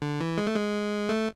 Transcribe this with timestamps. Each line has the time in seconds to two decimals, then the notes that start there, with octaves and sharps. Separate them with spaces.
0.02 D3
0.20 E3
0.38 G#3
0.47 A3
0.55 G#3
1.09 A3